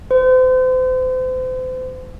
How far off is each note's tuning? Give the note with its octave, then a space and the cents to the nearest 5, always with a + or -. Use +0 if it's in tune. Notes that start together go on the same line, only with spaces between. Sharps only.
C5 -35